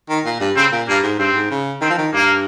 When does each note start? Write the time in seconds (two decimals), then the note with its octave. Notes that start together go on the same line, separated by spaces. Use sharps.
0.09 D#3
0.26 A#2
0.40 G2
0.56 C#3 C4
0.72 A#2
0.88 G2 A#3
1.04 G#2
1.19 G2 C4
1.35 G#2
1.51 C#3
1.82 D#3 C4
1.90 F3
1.98 D#3
2.13 G2 A#3